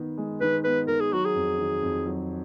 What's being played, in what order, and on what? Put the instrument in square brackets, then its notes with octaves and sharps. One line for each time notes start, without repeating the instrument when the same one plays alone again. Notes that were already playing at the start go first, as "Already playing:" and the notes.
Already playing: [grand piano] D#3 B3
G#3
[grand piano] D#3 [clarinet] B4
[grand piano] B3 [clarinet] B4
[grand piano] D#3 [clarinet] A#4
[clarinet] G#4
[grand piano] F#3 [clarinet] F#4
[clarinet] G#4
[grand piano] F2
D#3
F2
F#3